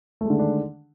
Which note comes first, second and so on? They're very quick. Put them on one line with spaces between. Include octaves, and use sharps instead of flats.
A3 G#3 D3 D#3 D4